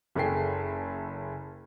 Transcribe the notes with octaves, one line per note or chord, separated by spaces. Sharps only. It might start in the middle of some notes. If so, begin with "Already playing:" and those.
F#1 G#4 A4 G5 C7